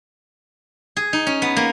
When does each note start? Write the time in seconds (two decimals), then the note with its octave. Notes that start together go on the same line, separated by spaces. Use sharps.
0.96 G#4
1.13 D#4
1.27 C#4
1.42 B3
1.56 A#3